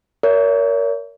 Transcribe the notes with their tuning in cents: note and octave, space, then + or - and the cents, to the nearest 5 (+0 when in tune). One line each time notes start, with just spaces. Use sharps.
A#4 +0 C#5 +40 E5 +0